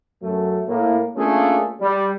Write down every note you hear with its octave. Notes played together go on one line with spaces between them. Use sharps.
F#2 F#3 A3
A2 A#3
A3 A#3 C#4 D4 F4 G#4
G3